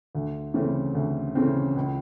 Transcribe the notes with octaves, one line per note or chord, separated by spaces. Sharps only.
D2
C#3 E3 A3 C4
D2
C#3 E3 A3 C4
C#2